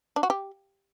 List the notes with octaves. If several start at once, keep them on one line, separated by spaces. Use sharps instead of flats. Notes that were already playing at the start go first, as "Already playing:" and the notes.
D4
F#4
G4